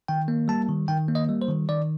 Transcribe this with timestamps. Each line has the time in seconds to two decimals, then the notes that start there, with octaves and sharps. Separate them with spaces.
0.08 D#3 G5
0.28 A#3
0.48 G3 A5
0.69 D#3
0.88 D#3 G5
1.08 A#3
1.15 D#5
1.29 G3
1.42 C5
1.48 D#3
1.69 D#3 D5